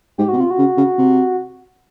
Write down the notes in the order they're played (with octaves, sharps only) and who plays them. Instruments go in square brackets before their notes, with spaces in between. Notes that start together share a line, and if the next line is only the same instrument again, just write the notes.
[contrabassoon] G#2 [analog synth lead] G4
[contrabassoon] B2 [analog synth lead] F#4
[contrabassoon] C3
[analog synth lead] F4
F#4
[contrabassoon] C#3
C#3
C3